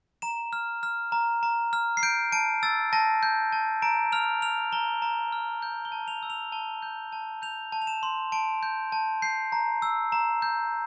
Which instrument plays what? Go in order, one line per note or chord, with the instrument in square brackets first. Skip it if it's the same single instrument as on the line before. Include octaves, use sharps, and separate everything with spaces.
[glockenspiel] A#5 E7
F6
F6
A#5
A#5
F6
C7
G6 D7
A5 D7
E6 A6
A5 A#6
G6
A5
A#5 D7
F6 F7
F6 F7
A#5 G7
A#5
F6
G6
G7
A5
F7
E6
F7
A5 G7
G6
A5
G6 F7
A5
F7
E7
C6
A5 D7
G6
A5
G6 C7
A#5
E6
A#5
G6